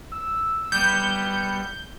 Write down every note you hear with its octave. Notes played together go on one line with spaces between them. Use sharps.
E6
G3 B3 G6 C#7